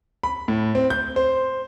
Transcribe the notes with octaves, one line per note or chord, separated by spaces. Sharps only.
B5
A2
C4
G6
C5